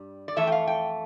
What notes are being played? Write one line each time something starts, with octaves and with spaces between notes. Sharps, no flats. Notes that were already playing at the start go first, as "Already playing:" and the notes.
Already playing: G2 G3
D5
F2 E3 A3 E5
G5
F5
G5